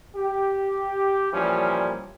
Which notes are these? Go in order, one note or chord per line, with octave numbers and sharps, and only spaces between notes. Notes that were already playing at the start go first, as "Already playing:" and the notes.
G4
A#2 E3 F3 G3 C#4